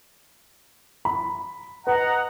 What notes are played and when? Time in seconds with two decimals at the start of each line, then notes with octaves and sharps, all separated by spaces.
1.05 B5
1.87 B4 D#5 F#5 A#5